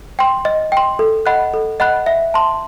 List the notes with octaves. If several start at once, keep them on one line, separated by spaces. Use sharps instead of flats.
G5 C6
D#5
G5 C6
A4
D#5 F#5 B5 F#6
A4
D#5 F#5 B5 F#6
E5
A5 C6